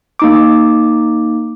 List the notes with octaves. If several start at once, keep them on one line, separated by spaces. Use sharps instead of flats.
A#3 D#4 D6